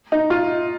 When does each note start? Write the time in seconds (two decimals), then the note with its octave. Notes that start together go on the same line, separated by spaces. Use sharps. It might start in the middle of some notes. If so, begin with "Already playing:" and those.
0.12 D#4
0.30 F4